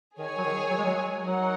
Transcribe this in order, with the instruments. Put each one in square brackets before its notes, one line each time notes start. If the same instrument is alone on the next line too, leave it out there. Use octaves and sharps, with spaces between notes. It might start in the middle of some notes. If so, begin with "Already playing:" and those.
[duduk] D#3 [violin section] G#4 C#5 G#5
[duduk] F#3
D#3
F#3
G#3
F#3
[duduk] F#3 [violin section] D#4 A#4 F#5